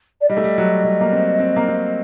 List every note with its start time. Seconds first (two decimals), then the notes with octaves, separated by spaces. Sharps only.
0.21 D5
0.29 G3 D#5
0.37 A3
0.44 G3
0.58 F#3
0.84 G3
1.01 A#3
1.12 C4
1.39 C4
1.56 A#3
1.68 C4